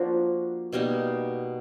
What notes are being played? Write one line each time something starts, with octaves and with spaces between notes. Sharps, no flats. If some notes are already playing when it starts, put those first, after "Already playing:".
Already playing: F3 A#3 D4 F#4
B2 G3 A#3 D#4